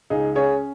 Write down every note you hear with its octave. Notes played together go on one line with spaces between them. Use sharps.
C#2 D#4 G#4
C#4 G#4 C#5